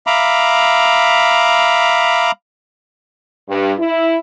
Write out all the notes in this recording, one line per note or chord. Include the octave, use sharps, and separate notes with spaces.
E5 F5 A#5 B5 D6
G2
E4